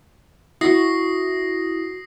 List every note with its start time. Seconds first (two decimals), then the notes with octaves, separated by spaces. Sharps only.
0.61 E4 F#4 D#6 A#6 C7